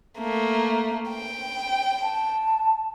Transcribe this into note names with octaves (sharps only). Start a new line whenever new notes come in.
A3 A#3
G5
A5